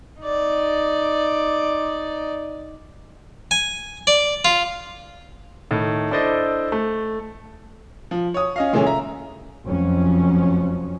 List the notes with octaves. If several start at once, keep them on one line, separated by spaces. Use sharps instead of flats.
D#4 D5
G#5
D5
F4
A2 D#3
D4 E4 A4 C5 D5 D#5
A3
F3
C#5 D#6
C#4 D#5 F5
A#2 C#3 E3 G#3 A3 C#4
E5 A#5
F1 F2 F3 F#3 C#4